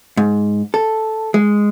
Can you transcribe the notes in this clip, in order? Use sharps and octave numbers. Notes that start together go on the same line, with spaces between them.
G#2
A4
G#3